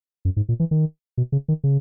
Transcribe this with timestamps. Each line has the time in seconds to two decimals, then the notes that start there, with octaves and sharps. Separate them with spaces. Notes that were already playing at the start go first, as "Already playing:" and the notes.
0.25 F#2
0.37 G#2
0.49 A#2
0.60 E3
0.71 D#3
1.17 B2
1.32 C#3
1.48 D#3
1.64 C#3